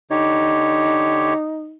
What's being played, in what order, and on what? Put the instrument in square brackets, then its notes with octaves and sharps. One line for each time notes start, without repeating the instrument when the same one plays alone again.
[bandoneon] D3 G4 C#5 [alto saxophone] D#4